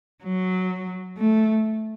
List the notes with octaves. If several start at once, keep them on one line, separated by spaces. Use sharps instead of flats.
F#3
A3